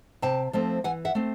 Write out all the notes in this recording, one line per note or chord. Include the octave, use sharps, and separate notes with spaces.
C3 G5 A5
F3 A3 C4
E3 F#5 G#5
E5 F#5
A3 C4